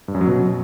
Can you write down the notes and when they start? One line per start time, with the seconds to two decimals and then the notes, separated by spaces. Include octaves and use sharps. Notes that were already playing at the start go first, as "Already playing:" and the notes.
0.08 G2
0.14 F#2
0.21 F#3
0.27 B2